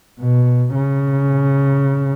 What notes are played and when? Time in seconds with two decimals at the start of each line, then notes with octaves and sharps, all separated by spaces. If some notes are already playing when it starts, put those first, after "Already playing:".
0.20 B2
0.75 C#3